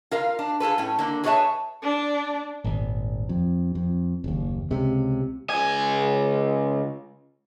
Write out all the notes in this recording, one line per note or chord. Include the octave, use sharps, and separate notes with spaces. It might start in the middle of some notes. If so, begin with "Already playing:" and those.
F4 A#4 F5
D4
F4 G#4 A4 B4
A2 C#4
D3 A#3
G#4 B4 C#5 D5 E5 A5
D4
D#1 G#1
F2
F2
F#1 D#2
C#2 C3
C#2 G#5